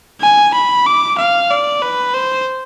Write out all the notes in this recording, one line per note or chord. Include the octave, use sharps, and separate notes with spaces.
G#5
B5
D6
F5
D5
B4
C5